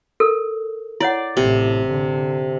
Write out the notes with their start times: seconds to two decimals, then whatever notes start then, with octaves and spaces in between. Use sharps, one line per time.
0.20 A4 A#4
1.00 E4 C#5 D5 F#5
1.37 A1 A2 C3
1.90 D3